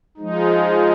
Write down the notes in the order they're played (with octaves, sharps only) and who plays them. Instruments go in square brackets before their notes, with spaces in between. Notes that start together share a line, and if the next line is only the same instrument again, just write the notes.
[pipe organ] F3 G#3 D#4